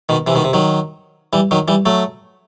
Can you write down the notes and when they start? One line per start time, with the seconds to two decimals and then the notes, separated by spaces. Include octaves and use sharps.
0.09 B2 D#3
0.27 C3 E3
0.35 B2 D#3
0.44 C3
0.53 D#3 F#3
1.33 E3 G3
1.51 D#3 F#3
1.68 E3 G3
1.86 F#3 A3